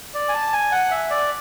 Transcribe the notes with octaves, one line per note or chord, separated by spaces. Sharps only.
D5
G#5
A5
G#5
F#5
E5
D5